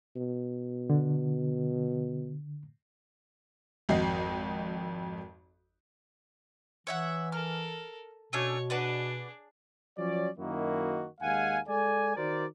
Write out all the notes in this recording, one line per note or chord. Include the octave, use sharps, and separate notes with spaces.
B2
D3
G#1 F2 F#4 D#5 C7
E3 C#5 E5 F#5
A4 A#4 F6
B2 A3 C#4 D4 C#5
D4 F#4 G#4 B4 D5
F3 F#3 C#4 D5
F#2 D#3 A#3 E4 F#4 D#5
D#2 G#3 F5 F#5 G#5
G#3 A4 D5 G#5
D#3 F#4 A#4 C5 D5